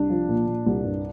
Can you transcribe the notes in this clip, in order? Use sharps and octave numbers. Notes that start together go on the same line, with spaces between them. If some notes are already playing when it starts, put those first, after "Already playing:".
Already playing: C2 D4
F3
A#2
A#2
C2
G2